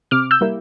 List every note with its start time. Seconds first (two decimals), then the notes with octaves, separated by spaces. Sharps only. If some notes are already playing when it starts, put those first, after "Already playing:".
0.11 C3 D6 F6
0.31 E6 G6
0.41 G3 A#3 E4